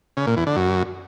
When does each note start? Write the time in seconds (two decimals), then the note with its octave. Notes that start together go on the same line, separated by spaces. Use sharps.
0.17 C#3
0.27 A#2
0.37 E2
0.47 D3
0.56 F#2